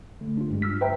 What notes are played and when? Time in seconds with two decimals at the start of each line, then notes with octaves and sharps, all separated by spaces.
0.21 D3 A3
0.37 D4 F4
0.50 G2 G#3
0.62 E6 F6 B6
0.81 B4 C5 E5 G5 A#5